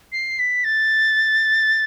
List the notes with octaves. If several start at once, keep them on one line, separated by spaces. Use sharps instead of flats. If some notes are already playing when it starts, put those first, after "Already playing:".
C7
B6
A6